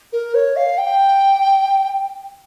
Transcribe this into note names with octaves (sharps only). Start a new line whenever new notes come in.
A#4
C#5
F5
G5